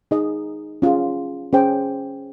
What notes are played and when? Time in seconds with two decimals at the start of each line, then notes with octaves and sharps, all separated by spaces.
0.11 D#4 G#4 D#5
0.82 C#4 F4 G#4
1.53 C#4 G#4 C5 G5